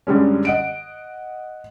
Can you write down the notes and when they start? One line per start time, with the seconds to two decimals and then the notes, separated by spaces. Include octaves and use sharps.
0.07 F#2 D3 G3 G#3 C#4
0.45 D#5 F#5 D7